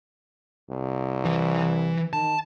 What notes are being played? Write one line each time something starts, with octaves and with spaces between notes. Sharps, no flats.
C2
E3 B4
D#3 A5